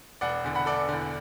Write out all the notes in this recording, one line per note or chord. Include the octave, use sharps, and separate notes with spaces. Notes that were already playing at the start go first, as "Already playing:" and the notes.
E1 D5 F#5
E2 D3
F#5 B5
E1 A4 D5
E2 D3